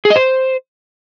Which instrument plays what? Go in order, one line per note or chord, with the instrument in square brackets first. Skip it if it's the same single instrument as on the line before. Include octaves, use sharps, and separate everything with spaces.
[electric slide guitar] G#4
D#5
C5